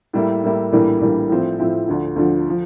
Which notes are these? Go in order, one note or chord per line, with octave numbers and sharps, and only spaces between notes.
A2 G3 A#3 E4
A2 G3 A#3 E4
A#1 A2 E3 G3 A#3
A#1 A2 E3 G3 A#3
A2 F3 C4 E4
A2 F3 C4 E4
D2 D3 F3
D2 D3 F3
F3